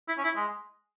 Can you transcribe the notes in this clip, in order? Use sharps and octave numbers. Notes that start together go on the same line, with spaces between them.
E4
C#4
E4
G#3